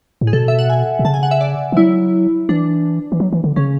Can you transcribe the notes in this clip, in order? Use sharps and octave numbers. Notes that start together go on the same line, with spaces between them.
A2
G#4
B2 A4
E5
F#5
G#5
B2
C#3 A5
G#5
F#5
E5
D5
E3
F#3 E4
E3 D4
E3
F#3
E3
D3
C#3 C#4